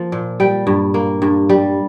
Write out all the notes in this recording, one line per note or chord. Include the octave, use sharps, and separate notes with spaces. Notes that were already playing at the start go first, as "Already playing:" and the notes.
Already playing: F3 A#3
A#2
G3 G5
G2
A#3
G2
G3